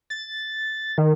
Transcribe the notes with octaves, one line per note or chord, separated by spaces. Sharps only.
A6
D#3